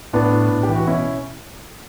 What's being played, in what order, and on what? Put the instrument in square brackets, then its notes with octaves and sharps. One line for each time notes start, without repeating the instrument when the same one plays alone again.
[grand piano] A2 B3 D4
A2
A2
G4
E3
F#4
B2 C#4 E4